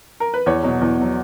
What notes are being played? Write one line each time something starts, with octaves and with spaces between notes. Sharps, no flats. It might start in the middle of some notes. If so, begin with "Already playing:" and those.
A#4
B4
E2 C#5
B2 F#3
E2
B2 F#3